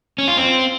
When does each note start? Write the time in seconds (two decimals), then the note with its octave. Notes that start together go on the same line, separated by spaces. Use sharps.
0.18 C#4
0.28 F4
0.37 C4